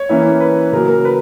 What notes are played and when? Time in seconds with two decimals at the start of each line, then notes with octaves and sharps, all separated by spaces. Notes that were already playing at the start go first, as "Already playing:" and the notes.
Already playing: C#5
0.09 E3 A#3 C#4 E4
0.40 B4
0.72 C#3 F#3 A#3 A#4
0.89 A#4
1.05 B4